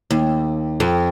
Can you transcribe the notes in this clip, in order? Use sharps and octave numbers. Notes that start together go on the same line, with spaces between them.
D#2
F2